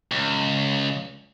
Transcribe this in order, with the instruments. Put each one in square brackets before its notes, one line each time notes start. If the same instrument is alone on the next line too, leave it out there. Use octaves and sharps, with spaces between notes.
[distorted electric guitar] C#2